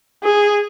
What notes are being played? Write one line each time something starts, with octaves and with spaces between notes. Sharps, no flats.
G#4